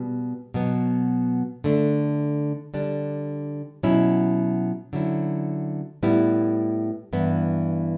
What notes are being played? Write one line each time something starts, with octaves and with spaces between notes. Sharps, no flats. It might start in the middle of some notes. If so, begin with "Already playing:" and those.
Already playing: B2 G3 B3
B2 F#3 B3
D3 A3 D4
D3 G3 D4
B2 F#3 C#4 E4
D3 F#3 C#4 E4
A2 G3 B3 E4
G2 E3 B3 E4